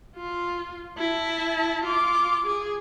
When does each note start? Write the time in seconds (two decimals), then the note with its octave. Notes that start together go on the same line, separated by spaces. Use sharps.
0.16 F4
0.98 E4 A5
1.84 F4 D6
2.47 G#4